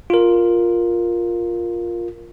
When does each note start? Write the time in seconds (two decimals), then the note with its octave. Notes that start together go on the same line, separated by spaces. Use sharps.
0.10 F4 A#4